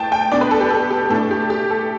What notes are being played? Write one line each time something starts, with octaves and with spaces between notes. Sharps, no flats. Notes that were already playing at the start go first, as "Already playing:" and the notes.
Already playing: A2 G5 A5
G5
B2 B3 D4 D5
B4
A4
G4
A4
G4
A2 A3 D4 A4
G4
G4
A4